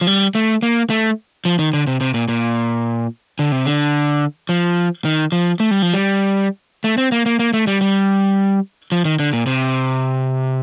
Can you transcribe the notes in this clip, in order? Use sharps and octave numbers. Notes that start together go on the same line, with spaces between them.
F3
G3
A3
A#3
A3
F3
D#3
D3
C3
C3
A#2
A#2
D3
C3
D3
F3
D#3
F3
A3
G3
F3
G3
A3
C4
A#3
A#3
A#3
A3
G3
G3
F3
D#3
D3
A#2
C3